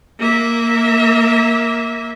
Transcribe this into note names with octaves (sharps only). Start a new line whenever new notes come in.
A#3 E5